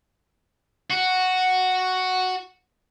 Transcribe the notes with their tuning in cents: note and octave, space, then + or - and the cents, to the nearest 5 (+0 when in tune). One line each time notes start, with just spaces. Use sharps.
F#4 +0